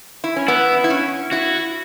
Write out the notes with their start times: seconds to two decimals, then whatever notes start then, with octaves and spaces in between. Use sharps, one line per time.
0.24 E4
0.36 C#4
0.48 B3 E4
0.84 E4
0.90 C#4
1.31 E4 F#4